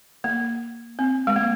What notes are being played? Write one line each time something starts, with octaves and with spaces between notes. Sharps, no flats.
A#3
C4
G#3
A#3